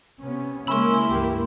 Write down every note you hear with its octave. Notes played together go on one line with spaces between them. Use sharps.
C3 B3 C#4
C#3 G#3 A#3 C#4 E4 B5 C6 E6
C#2 G2 E3 G4